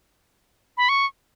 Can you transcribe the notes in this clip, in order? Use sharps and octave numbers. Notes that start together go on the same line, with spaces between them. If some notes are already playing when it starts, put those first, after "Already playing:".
B5
C#6